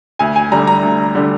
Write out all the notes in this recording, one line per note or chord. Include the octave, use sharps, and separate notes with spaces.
D2 G#5
G#5
D3 G3 A#5
A#5
D2
D3 G3